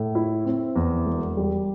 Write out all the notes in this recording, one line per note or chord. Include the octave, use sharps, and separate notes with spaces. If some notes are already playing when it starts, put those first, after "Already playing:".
Already playing: A2
E4
C4
E2
E1
G3